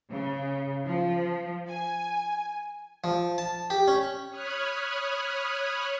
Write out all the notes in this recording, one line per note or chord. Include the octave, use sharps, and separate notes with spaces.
C#3
F3
G#5
F3
A5
G4
C#4
C#5 B5 D#6 F6 F#6 G#6